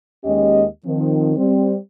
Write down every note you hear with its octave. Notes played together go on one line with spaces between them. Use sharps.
D#2 G#3 C#4 G4 D#5
D#3 F3 C4
G3 C4